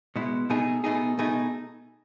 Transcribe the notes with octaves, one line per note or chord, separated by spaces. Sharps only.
B2 G#3 B3 E4
B2 A3 D#4 G#4
B2 A3 D#4 G#4
B2 A3 D#4 G#4